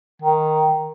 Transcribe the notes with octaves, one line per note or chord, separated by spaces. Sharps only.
D#3